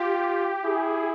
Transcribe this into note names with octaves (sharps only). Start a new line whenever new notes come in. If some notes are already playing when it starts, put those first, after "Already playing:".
Already playing: F4 G4
E4 G#4